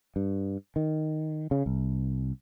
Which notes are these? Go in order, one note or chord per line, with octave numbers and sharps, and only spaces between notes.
G2
D#3
C#3
C2